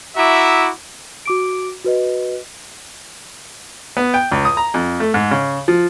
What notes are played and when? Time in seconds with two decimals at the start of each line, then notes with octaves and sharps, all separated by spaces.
0.16 E4 F#4 E5 A#5 D6
1.26 F#4 D6 D7
1.84 F#4 B4 D#5
3.97 B3
4.14 G5
4.31 C#2
4.45 D#6
4.57 A#5
4.74 F2
5.00 A3
5.14 G#2
5.31 C#3
5.68 F3